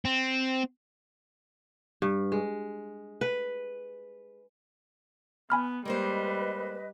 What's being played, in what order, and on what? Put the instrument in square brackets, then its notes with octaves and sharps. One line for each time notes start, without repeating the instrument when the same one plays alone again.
[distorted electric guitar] C4
[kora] G2
G#3
B4
[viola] B3 [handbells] G#5 B5 F6
[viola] G3 [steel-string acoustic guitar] G#3 A#3 C5 [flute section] B4 D#5